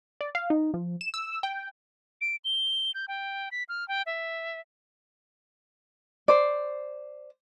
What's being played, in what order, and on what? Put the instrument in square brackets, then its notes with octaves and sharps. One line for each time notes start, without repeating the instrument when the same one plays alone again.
[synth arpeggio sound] D5
F5
D#4
F3
E7
E6
G5
[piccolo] D7
G7
G6
G5
B6
F6
G5
E5
[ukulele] C5 D5